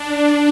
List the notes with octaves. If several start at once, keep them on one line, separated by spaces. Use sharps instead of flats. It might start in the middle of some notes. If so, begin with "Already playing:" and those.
Already playing: D4